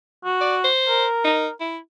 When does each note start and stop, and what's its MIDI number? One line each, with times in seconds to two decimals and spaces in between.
0.25 0.67 66
0.41 0.56 74
0.64 1.05 72
0.89 1.51 70
1.24 1.48 63
1.60 1.78 64